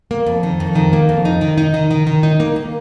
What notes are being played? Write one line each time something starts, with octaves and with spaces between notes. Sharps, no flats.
A#3
F2
D#3
F2
D#3
A#3
F2
D#4
D#3
D#4
D#3
D#3
D#3
D#4
A#3
A#3